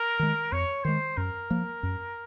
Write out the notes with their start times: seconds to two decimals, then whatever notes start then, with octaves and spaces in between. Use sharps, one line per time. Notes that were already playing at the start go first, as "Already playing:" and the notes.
Already playing: A#4
0.19 D#3 G#3
0.52 F2 C#5
0.84 D#3 G#3 C5
1.17 F#2 A#4
1.50 F3 A#3
1.83 F#2